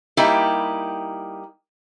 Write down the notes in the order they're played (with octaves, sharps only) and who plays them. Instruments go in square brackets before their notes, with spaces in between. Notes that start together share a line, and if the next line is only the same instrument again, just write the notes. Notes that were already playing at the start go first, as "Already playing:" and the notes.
[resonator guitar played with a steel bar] G3 A#3 D#4 E4 G4